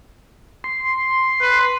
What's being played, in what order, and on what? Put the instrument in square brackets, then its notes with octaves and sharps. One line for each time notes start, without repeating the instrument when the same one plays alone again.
[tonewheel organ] C6
[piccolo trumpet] B4